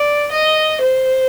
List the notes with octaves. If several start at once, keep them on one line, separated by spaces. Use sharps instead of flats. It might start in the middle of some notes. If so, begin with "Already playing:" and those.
Already playing: D5
D#5
C5